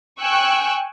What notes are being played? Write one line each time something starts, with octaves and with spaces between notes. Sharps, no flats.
G5 G#5 C#6 E6 F#6